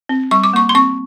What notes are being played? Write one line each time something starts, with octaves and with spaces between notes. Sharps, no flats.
C4
G3 C#6
D6
A#3 C#6
C6
C4 C#6